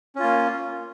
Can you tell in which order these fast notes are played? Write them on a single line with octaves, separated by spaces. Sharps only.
C#4 F4 A#3